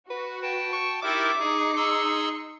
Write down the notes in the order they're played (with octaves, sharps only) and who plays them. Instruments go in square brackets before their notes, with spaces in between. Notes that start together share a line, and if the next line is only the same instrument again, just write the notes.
[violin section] F#4 [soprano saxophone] B4
[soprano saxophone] B4 [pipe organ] G5 A5
[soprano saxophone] C#6
[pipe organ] D#4 E4 A#4 [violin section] G4 E5 A6 [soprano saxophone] D6
[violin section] D#4 C#7 [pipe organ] G#4
[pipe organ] G#4 C6 E6